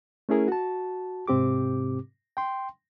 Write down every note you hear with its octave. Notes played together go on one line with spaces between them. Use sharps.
A3 C#4 E4 G#4 A#4
F#4 A5
G#2 C3 C4 G4 D6
G5 C6